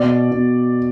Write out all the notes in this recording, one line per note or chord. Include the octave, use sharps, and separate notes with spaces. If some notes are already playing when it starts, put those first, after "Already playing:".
Already playing: B2 D5
B2